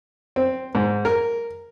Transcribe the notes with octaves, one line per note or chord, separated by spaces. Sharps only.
C4
G#2
A#4